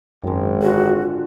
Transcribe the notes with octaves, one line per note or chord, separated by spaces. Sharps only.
G#1 F#2 D#3 G#3
D3 F4 F#4 G#4